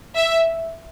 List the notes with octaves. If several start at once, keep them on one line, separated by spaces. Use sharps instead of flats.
E5